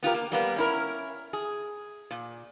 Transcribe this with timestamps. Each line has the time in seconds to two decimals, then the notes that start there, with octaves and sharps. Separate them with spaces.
0.03 B3 F4 G4 A#4
0.14 A#3
0.32 G3 A#3 B3
0.56 C#4 E4 A#4
1.33 G#4
2.11 A#2